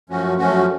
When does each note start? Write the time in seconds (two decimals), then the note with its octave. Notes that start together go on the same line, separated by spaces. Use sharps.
0.09 F#2 F3 A3 C#4 F#4
0.37 F#2 F3 A3 C#4 F#4